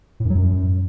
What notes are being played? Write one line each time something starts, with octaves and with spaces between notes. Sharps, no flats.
A2
F#2
F#3
F#2